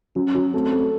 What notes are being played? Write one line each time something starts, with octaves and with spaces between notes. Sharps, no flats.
F#3 C#4
F#3
A3 C4
A3